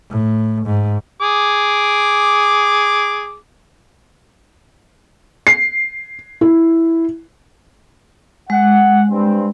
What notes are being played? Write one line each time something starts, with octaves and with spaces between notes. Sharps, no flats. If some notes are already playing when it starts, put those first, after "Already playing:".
A2
G#2
G#4 D6
C7
E4
G#3 F#5
G2 C4